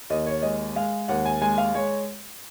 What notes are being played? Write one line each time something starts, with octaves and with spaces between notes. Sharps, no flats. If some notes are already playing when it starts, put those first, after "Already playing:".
D#2 D#5
C#5
G#3 D#5
G#3 F5
D#2 F#5
G#5
G#3 G#5
F5
G#3 C#5